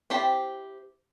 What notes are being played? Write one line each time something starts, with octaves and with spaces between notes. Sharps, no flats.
C4 E4 G4 C5 A5